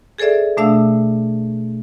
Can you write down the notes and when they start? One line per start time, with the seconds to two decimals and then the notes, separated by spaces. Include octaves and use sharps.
0.18 G#4 A4 C5 D5 E5
0.57 B2 A3 D4 E5 F5 E6